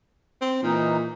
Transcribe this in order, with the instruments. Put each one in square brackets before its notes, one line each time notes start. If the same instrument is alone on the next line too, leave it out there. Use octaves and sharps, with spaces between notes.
[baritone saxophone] C4
[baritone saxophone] A#2 [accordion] E3 D#4